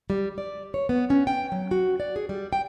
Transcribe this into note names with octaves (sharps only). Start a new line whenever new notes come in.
G3
D5
C#5
B3
C#4
G5
F#3
F#4
D5
G#4
G3
G5